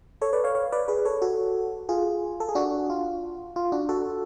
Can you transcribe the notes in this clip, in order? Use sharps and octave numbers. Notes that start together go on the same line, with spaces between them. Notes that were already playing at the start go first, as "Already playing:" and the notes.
A4 C#5
B4 D5
C#5 F5
C#5 F5
B4 D5
G#4 B4
A4 C#5
F#4 A4
F4 G#4
A4
G#4
D4 F#4
F4
F4
D4 F#4
F#4 A4